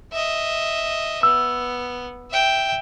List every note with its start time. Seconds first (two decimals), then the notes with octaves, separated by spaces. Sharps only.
0.13 D#5 E5
1.23 B3 E6
2.31 E5 G5